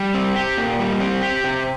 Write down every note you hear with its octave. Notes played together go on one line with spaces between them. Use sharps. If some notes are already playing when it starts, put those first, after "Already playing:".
Already playing: G3
C4
G4
A#2
G3
C4
G4
C3